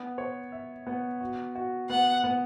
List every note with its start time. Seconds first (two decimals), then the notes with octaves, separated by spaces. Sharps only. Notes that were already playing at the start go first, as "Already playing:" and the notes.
Already playing: B3
0.18 C#5
0.52 E5
0.87 B3
1.21 F#4
1.55 F#4
1.89 B3 F#5
2.24 B3